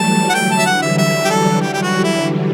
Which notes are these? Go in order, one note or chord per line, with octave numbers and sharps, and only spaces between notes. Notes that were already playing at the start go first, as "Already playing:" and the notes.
Already playing: E3 F#3 G3 A3 A5
F#5
D3 F#3 G5
A5
E5
E3 G3 F#5
E5
D3 F#3 E5
G4
A4
G4
G4
F#4
E4